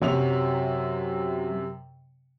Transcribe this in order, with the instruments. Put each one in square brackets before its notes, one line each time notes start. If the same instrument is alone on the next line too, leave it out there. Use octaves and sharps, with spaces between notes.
[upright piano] F#2 C3 F7 [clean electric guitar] F#3